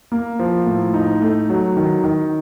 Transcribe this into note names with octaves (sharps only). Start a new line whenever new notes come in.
A#3
F3
A2
D#4
A3
F#3
D#3
D#3